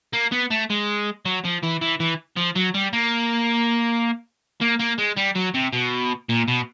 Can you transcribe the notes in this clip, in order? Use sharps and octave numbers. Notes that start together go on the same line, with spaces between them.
A#3
B3
A3
G#3
F#3
F3
E3
E3
E3
F3
F#3
G3
A#3
A#3
A#3
G#3
G3
F#3
C3
B2
A#2
B2